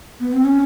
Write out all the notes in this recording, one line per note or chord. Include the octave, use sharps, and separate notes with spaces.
B3
C4
C#4